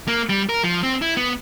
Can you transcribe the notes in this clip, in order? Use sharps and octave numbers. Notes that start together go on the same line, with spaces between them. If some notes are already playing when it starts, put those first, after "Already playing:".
A#3
G3
A#4
F3
C4
E4
B3